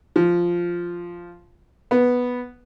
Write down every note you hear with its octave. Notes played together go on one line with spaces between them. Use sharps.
F3
B3